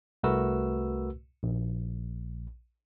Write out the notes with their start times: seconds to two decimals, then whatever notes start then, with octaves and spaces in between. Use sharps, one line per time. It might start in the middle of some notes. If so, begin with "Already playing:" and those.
0.23 C2 A3 F#4 A#4 B4 E6
1.43 A#1